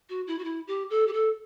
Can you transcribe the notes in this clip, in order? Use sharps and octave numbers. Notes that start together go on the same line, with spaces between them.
F#4
E4
F#4
E4
G4
A4
G4
A4